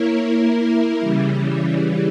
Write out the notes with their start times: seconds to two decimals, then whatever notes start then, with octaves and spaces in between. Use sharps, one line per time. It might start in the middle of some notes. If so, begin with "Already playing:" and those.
Already playing: A#3 E4 A#4 C#5
0.28 A#3 E4 A#4
1.00 C#3 E3 G3